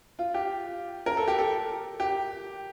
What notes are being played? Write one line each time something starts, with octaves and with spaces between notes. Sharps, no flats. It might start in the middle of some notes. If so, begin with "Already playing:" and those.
F4
G4
A#4
A4
G4
A4
G4